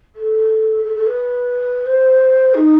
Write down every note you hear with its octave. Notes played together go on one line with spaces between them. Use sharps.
A4
A4
A4
B4
C5
D#4